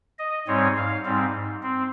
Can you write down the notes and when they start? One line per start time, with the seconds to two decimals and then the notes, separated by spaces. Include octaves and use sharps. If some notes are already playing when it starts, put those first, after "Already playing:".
0.18 D#5
0.48 G#2 G3 C4 C#5
0.77 F5
1.05 G#2 G3 C4
1.63 C4